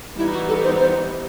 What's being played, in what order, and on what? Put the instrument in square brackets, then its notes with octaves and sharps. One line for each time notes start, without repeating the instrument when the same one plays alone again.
[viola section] E3 G3 B3 D#4 [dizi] E4
[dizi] F#4
A4
C5
C5